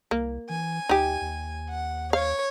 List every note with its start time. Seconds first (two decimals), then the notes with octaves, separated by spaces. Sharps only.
0.11 C2 A#3
0.49 E3 G#5
0.89 D2 D#4 G4
1.21 D#2
1.68 F#5
2.13 C#5 F5